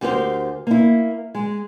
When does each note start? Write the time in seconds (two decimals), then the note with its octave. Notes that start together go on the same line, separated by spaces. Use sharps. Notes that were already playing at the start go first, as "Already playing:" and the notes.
0.01 D2 G4 A#4 C5
0.67 A#3 E4
1.35 G#3